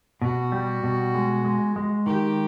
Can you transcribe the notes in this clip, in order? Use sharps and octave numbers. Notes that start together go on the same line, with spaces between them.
B2 F#4
G3
B2
G#3
G#3
G#3
D#3 G4